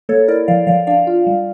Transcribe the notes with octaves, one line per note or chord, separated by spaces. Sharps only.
A#3 A4 C#5
E4 A#4 D5
F3 D5 F5
F3 D5 F5
D4 D5 F5
F4
G3